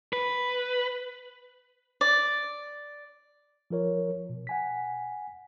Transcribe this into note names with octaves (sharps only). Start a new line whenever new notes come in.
B4
D5
F3 F4 A#4 C#5
B2
F#5 G#5 B6